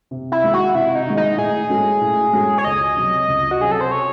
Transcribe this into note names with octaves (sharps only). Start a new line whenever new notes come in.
C3
E4
D#3 G#3
F#4
C3 E4
D#4
D#3 G#3
D#4
A2 G#4
G#3 C#4 F#4 A4
A2
G#3 C#4 F#4 A4
C#5
C#2 D#5
C3 F#3 C#4
C#2
F#4
C3 F#3 C#4 G#4
A4
C5
C#5